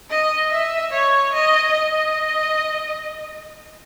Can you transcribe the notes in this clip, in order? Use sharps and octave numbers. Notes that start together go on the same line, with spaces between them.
D#5
E5
C#5
D#5
D#5